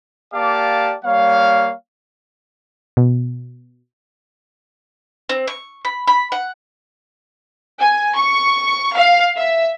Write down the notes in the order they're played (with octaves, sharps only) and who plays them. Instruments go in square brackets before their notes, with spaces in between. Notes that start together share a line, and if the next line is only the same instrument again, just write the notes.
[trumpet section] A#3 G4 D5 F5 A5 D6
G3 A#3 C#5 F5
[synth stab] B2
[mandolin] C4
C#6
B5
B5
F#5
[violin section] G#5
C#6
F5
E5